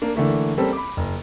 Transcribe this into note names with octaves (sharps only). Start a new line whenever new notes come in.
A#3 D4
D3 E3 A3 A#3
G3 A#3 C4 C#4 G4 A4
B5 D6
F#1